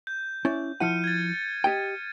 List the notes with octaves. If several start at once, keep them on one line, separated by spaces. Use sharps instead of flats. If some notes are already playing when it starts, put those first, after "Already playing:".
G6
C#4 E4 D5
F3 E4 F#5 F6 C#7 D#7
G#6 A6
G4 D#5 G5